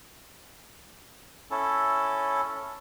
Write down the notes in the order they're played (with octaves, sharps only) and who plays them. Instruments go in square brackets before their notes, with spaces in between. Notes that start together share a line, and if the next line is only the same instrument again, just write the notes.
[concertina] C#4 E4 A4